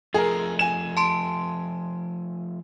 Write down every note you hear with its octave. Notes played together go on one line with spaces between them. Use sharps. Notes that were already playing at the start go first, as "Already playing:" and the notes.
F3 A3 G#4 A#4
G#5 E7
A5 C6 D7